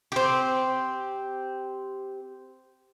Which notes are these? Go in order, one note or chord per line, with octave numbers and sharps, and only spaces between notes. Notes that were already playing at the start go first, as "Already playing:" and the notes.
C4 G4